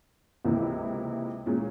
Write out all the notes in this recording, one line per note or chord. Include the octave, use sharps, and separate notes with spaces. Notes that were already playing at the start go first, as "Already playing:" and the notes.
C#2 C3 E3 A#3 E4
A#2 G#3 C#4